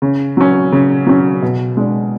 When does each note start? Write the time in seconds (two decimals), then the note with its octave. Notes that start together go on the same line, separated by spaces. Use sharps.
0.02 C#3
0.37 F#3 C#4
0.72 C#3
1.06 F#3 C#4
1.42 B2
1.77 G#3 D4